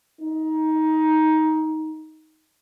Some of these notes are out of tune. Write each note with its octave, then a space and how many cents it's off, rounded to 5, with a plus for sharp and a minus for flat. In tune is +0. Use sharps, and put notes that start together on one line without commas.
D#4 +15